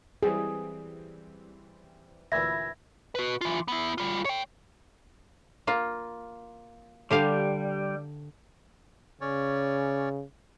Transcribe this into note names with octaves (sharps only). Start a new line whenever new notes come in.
E3 G3 C4 G#4
D2 A#2 E3 E5 B5 E6 G#6 A#6
F#4 B4
E3 F4
B3 E4
G3 F4
C#5 G5
A#3 F4
D3 G3 G4 F5
C#3 C#4 C#5 D5